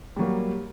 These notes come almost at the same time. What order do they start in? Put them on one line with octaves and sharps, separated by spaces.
G3 F#3 A#3